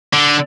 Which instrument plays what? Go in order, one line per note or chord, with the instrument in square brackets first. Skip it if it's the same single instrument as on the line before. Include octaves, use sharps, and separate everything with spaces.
[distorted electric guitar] D3